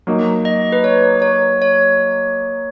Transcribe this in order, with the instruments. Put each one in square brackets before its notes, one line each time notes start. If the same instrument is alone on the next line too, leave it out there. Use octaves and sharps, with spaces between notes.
[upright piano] F#3 A#3 D#4
[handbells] D#5
B4
C#5
C#5
C#5